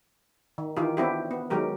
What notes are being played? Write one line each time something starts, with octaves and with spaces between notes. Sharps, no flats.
D#3
D#3 E3 F4 G4
B3 C4 D4 E4 F#4 G4
B3
D#3 F#3 G#3 G4 A#4